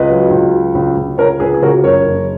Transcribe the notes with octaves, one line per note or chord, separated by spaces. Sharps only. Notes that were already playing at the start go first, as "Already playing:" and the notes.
Already playing: C#2 B4 D#5
F#3
C#2
F#3
C#2
C#2
C#2 A#4 C#5
C#2 G#4 B4
G#4
C#3 F#4 A#4
F#1 A#4 C#5
F#1